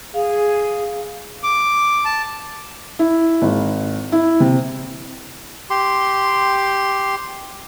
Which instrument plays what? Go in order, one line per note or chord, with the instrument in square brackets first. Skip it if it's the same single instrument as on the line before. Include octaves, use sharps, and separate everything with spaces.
[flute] G#4 [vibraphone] F5
[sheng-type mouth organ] D6
A5
[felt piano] E4
G#1
E4
C3
[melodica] G4 C6